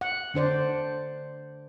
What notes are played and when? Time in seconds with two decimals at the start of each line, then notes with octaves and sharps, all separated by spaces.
0.01 F#5
0.34 D3 D4 C5 D5